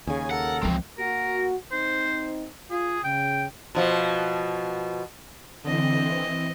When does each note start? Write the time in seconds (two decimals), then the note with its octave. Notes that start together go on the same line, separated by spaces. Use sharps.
0.07 D#2 C#3 C#4 G#4 G#5
0.31 A4 A#4 F#5
0.63 C#2 E3 F3 C4
0.98 A#3 F#4 A#4
1.72 C4 D#4 C5
2.70 F4 G#4
3.04 C#3 G5
3.75 B2 F3
5.64 D3 E3 C4 D#5